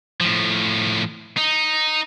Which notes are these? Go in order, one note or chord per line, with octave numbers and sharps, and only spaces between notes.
A2 F3
D#4